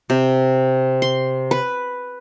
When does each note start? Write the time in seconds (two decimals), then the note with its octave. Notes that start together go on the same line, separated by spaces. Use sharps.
0.10 C3
1.02 C6
1.51 B4